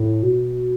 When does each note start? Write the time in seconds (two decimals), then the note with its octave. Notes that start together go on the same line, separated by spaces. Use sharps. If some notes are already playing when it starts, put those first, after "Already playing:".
Already playing: A2
0.22 B2